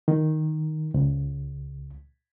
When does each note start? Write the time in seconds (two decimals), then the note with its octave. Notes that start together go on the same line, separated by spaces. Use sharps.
0.08 D#3
0.94 C#2